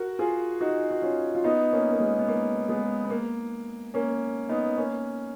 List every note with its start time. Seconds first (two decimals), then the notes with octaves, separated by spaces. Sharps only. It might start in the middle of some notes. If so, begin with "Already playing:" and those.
Already playing: F#4 A#4
0.19 F4 G#4
0.61 D#4 F#4
0.91 F#4
1.02 C#4 F4
1.35 F4
1.44 B3 D#4
1.73 A#3 C#4
1.92 A#3
2.00 G#3 B3
2.19 B3
2.28 A#3
2.69 G#3 B3
3.05 B3
3.10 A#3
3.94 A#3 C#4
4.49 B3 D#4
4.77 A#3 C#4